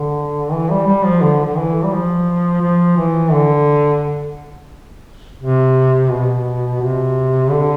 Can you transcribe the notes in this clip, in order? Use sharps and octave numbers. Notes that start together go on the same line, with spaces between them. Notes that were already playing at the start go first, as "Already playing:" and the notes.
Already playing: D3
E3
G3
G3
F3
D3
D3
E3
G3
F3
F3
E3
D3
C3
B2
C3
D3